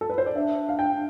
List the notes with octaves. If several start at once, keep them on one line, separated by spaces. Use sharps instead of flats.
A4
B4
C5
D5
D4 E5
F5
G5